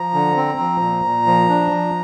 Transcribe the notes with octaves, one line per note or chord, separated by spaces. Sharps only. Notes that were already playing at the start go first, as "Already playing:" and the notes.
Already playing: F3 A#5
D3
C4
F3
A#2
A#2
F3
D4
F3